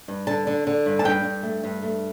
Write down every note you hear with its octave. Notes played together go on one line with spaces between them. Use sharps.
G2
D3 A5
D3
D3
G2
A5
G2 G5
G2
A3
G2
A3